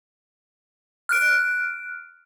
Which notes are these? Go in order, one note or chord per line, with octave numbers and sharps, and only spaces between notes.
F6 F#6 D7